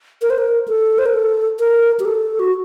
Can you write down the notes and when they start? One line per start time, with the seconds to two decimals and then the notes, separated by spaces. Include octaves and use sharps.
0.22 A#4
0.30 C5
0.38 A#4
0.68 A4
0.98 C5
1.06 A#4
1.14 A4
1.59 A#4
2.00 G4
2.05 A4
2.39 F#4